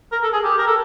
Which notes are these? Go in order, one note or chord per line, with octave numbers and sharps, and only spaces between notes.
A#4
A4
G#4
G4
A#4
A4